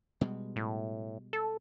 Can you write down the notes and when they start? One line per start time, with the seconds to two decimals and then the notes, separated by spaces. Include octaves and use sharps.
0.21 B2 G3 G#3
0.56 A2
1.33 A4